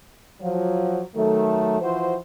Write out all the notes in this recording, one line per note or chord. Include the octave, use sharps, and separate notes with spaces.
F3 F#3
D#3 F#3 A3
E3 F3 F#4 C5